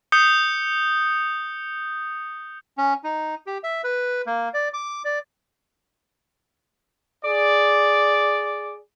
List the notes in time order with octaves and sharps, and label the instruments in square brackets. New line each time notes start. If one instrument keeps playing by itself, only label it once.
[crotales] D#6 G6 C#7 G7
[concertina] C#4
D#4
G4
E5
B4
A#3
D5
D6
D5
[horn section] G#4 D5